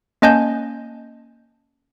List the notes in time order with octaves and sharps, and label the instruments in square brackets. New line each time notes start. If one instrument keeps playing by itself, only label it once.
[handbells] A#3 C#4 D#5 G#5 A5 G6